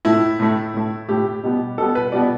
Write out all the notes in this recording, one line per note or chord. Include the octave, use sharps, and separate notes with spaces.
A2 A3 E4
A2 A3
A2 A3
A2 A3 G4
B2 G3 B3
B2 G3 B3 A4
B4
B2 G3 B3 D5